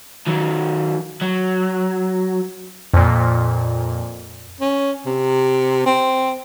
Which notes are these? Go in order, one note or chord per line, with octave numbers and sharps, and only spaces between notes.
D#3 F#3
F#3
F2 A#2
C#4
C3
C4